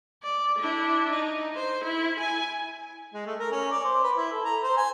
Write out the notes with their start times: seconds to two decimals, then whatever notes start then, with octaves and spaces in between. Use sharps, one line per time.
0.23 D5
0.59 D4 E4
1.11 D#4
1.55 C5
1.84 E4
2.20 G#5
3.14 G#3
3.26 A3
3.39 A#4
3.51 C#4
3.71 D5
3.84 C5
4.03 B4
4.16 E4
4.32 A4
4.44 A#5
4.63 C5
4.77 G#5